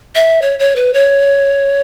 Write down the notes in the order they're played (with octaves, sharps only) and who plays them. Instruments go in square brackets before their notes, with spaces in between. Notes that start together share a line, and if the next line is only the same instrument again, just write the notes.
[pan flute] E5
C#5
C#5
B4
C#5